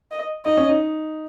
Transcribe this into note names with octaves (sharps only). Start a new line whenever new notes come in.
D#5
D#4 D#5
C#4
D#4